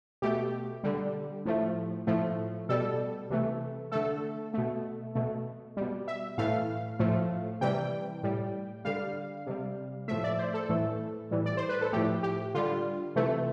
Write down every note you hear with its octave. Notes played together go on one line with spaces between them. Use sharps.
B2 A3 G4
D3 G3
A2 F3 A3
A2 F3 A3
B2 G3 A4
C3 E3 A3
D3 A3 A4
B2 A3
B2 A3
B2 G3
E5
A2 E3 A3 F5
A2 F3 A3
C3 E3 G3 G5
A2 G3
D3 G3 F5
C3 G3
A2 F3 A3 E5
D5
C5
A4
A2 E3 A3
A2 E3 G3
D5
C5
B4
A4
A2 F3 A3 G4
G4
D3 G3 F4
C3 E3 A3